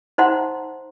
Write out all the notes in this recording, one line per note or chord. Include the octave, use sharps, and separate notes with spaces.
D#4 C5 E5 F#5 A#5 C6